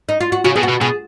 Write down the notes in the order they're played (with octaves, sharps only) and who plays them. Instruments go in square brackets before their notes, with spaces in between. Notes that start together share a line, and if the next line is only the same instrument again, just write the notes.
[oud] D#4
F4
F#4
[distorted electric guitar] C#3 [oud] F#4
[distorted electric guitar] B2 [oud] G#4
[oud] F#4
[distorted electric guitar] B2
[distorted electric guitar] B2 [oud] G#4